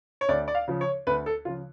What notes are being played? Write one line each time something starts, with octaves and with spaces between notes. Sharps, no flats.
C#5
D2 D5
D5
F5
C#3 F3
C#5
D2 B4
A4
C#3 F3 F4